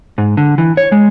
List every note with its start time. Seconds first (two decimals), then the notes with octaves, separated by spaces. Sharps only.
0.18 G#2
0.37 D3
0.58 E3
0.77 C#5
0.92 G#3